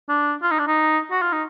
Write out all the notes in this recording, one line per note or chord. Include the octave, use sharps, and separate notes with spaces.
D4
F4
D#4
D4
D#4
F#4
F4
D#4